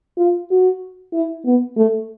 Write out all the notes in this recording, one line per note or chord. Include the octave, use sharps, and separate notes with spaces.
F4
F#4
E4
B3
A3